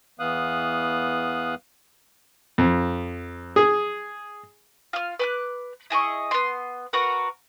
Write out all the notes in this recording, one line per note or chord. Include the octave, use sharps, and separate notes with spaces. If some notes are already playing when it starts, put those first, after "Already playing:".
E2 E3 B3 F5 D#6 F#6
F2
G#4
F4 F6
B4 D6 F#6
E4 G#4 D#5 C#6
B3 C6
F#4 A#4 B4 F#5